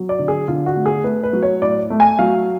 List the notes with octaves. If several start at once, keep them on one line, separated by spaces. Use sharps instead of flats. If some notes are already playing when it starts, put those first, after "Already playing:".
Already playing: F#3
D5
D3
G#4
D3 F4
F#4
A3
G#4
A3 B4
B4
F#3
C#5
A2 D5
A3
G#5
F#3 F5